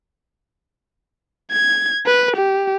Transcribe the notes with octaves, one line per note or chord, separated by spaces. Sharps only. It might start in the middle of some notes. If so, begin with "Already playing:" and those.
G#6
B4
G4